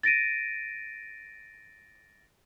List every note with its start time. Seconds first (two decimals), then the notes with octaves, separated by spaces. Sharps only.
0.03 A6 A#6 D7 D#7